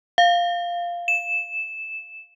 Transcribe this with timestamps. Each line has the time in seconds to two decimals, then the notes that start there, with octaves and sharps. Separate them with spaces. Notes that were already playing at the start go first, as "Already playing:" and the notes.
0.18 F5
1.08 E7